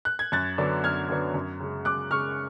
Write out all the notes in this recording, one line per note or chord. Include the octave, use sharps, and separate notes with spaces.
F#6
G#6
F#2 F#6 A6
D3 F#3 B3 D4
F#2 F6 G#6
D3 F#3 B3 D4
F#2
C#3 G#3
F#2 D6 F#6
C#3 G#3 C#6 F6